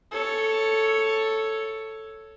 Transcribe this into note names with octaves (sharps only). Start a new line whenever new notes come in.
A4 C#5